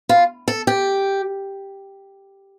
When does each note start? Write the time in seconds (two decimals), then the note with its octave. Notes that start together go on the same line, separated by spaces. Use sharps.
0.09 F4
0.48 A4
0.67 G4